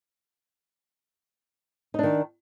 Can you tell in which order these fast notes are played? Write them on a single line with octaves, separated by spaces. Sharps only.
D#4 D4 D#3